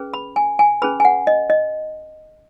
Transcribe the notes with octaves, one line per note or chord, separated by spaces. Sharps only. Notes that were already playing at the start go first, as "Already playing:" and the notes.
Already playing: C#4 G#4 B4
B5
G#5
G#5
C#4 G#4 B4 B5
G#5
F#5
D#5
D#5